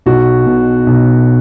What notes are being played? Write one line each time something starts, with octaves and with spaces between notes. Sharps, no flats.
B1 F#4
B2
B1